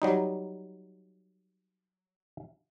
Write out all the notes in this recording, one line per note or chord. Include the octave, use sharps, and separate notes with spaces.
F#3 G3 D#4